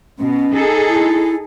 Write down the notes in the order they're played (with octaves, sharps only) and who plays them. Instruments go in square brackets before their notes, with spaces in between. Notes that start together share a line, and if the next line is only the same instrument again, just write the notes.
[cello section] B2 [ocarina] C#4
[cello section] D#4 G#4 A4
[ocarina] E4